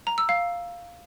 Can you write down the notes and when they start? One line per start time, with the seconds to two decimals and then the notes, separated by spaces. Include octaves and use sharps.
0.07 A#5
0.18 E6
0.29 F5